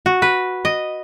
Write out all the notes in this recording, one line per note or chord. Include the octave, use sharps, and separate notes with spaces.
F#4
B4
D#5